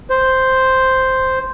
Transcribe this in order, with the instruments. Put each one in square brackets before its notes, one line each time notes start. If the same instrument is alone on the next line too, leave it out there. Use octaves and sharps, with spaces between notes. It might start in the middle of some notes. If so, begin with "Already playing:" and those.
[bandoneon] C5